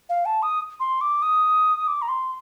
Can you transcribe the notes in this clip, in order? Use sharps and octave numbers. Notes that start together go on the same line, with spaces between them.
F5
A5
D#6
C6
D6
D#6
D6
A#5
C6